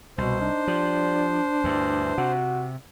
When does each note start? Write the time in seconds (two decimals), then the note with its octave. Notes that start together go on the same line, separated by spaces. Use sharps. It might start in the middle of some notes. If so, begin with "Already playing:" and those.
0.18 C2 B2 C5
0.40 D4 D#4
0.67 F3 G3
1.64 D2 G2 E3
2.18 C3 F#4